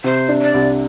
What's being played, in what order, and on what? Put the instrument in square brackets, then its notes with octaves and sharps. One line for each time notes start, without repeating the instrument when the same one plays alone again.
[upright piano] C3 [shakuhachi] C5
[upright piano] D4
[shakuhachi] D5
[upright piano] C2